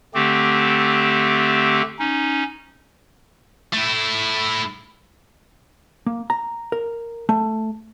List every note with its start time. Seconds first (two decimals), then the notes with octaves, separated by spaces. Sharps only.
0.14 D3 A3 C4 G4
1.99 C#4 D#4
3.73 A3 E4
6.06 A#3
6.30 A#5
6.72 A#4
7.29 A3